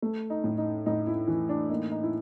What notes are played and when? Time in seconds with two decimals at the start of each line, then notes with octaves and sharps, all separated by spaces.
0.02 A3
0.30 D#4
0.44 A2
0.58 D#4
0.86 A2 D#4
1.07 E4
1.28 E3
1.49 D4
1.70 A#3 D#4
1.91 D#4
2.03 E4